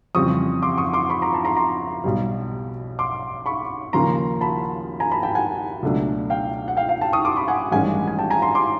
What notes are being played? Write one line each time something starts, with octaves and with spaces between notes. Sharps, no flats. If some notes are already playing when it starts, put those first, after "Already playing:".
F2 C#3 E3 G3 C4 C#6 D#6
C6 D6
C#6 D#6
C6 D6
B5 C#6
A#5 C6
A5 B5
A#5 C6
A#5 C6
B1 B2 G3
C6 D6
B5 C#6
D#2 C#3 F3 A#3 C#4 A#5 C6
A5 B5
G#5 A#5
A5 B5
G5 A5
F#5 G#5
C#2 B2 F#3 A3 D4
F5 G5
F#5
F5 G5
F5 G5
G5 A5
C#6 D#6
C6 D6
B5 C#6
F#5 G#5
A1 G2 D#3 G#3 C#4 F#5 G#5
G#5
G5 A5
G#5 A#5
A#5 C6
C6 D6